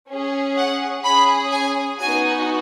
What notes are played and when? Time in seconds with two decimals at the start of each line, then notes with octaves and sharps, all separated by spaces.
0.09 C#4 G#4
0.57 F#5
1.03 C#4 G#4 B5
1.51 G#5
1.99 B3 D#4 F#4 G#5